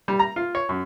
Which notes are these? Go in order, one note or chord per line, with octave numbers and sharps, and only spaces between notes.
G3
A#5
F4
C#5
F#2